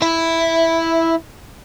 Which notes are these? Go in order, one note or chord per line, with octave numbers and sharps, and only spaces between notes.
E4 E5